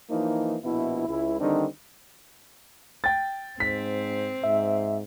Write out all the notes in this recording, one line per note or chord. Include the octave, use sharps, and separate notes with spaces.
E3 F3 A#3 D#4
A#1 B2 B3 E4
C#2 E4
D3 D#3 G3 C4 D4 D#4
G5 A6
G#2 C4 B6
G#2 E5